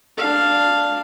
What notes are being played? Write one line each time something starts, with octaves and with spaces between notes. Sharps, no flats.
D4 F5